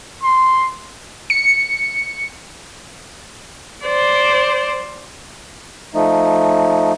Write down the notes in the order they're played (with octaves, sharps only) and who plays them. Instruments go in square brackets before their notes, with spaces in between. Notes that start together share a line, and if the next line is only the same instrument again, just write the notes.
[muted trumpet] C6
[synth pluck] C#7
[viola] C5 D5
[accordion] F3 A3 D#4